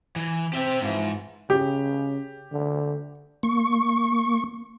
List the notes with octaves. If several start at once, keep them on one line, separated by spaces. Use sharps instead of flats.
E3
C4 G4 E5
G#2 E3 F3
C#3 G4
D3
A#3 C#6